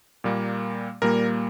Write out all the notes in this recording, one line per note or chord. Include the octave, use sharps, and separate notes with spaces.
A#2 G3 A#3
A#2 G3 A#3 A#4